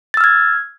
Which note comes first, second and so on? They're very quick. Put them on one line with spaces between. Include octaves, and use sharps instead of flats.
A6 E6 F6 G#6